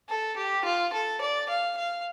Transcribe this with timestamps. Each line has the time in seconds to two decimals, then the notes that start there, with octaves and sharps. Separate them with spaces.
0.09 A4
0.37 G4
0.65 F4
0.93 A4
1.21 D5
1.49 F5
1.77 F5